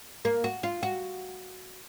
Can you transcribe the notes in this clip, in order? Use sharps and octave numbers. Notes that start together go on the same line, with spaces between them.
A#3
F#4
F4
F#4